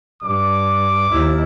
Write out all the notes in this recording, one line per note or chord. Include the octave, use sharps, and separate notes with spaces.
G2 D6
D#2 E4